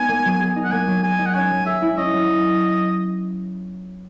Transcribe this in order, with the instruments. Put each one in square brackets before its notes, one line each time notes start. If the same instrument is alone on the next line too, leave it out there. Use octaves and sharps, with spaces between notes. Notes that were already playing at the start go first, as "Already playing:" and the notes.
Already playing: [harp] B3 D#4 [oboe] G#5
[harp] A#3
F#3
G#4
D#4
[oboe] F#5
[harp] A#3 [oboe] G#5
[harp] F#3
[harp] G#4 [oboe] G#5
[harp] D#4
[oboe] F#5
[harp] C#4 [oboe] G#5
[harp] F#3
[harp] G#4 [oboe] E5
[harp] E4
[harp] C#4 [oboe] D#5
[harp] F#3